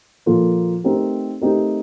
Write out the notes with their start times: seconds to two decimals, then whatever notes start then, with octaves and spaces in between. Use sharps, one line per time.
0.26 A#2 F3 A#3 F4 A4
0.84 A3 C4 D#4 G4 A#4
1.41 A3 C4 D#4 G4 A#4